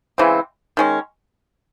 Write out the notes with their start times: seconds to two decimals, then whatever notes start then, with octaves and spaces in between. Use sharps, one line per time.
0.18 C#3 E3 G#3 C4
0.77 D#3 G#3 C#4